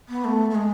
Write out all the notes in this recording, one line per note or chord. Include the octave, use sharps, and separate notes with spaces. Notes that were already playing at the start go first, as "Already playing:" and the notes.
B3
A3
A3
G#3